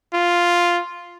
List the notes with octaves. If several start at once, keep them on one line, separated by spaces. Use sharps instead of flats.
F4